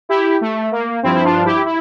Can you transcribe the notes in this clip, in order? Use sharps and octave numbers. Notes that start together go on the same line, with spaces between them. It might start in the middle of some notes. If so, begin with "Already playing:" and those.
E4 G4
A3
A#3
G2 F3 C4 E4
E4
D4 F4
E4 G4
E4